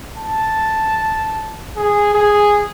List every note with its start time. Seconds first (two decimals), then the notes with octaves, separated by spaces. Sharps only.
0.17 A5
1.76 G#4
2.14 G#4